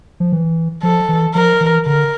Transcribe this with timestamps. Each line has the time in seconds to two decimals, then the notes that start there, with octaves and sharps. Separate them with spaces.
0.20 F3
0.32 E3
0.83 F3 A4
1.09 E3
1.34 F3 A#4
1.61 E3
1.86 D3 A#4